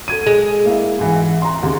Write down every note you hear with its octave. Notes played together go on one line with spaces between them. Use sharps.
A4 G#6 D#7
G#3
A#3 E4 E5
G#2 E3 E4
A#5 C6
D#2 C#3